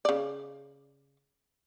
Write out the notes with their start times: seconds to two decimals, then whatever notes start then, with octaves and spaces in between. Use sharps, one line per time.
0.05 C#3 D5